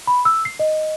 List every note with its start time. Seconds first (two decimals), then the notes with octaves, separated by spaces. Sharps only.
0.07 B5
0.25 E6
0.45 C7
0.60 D#5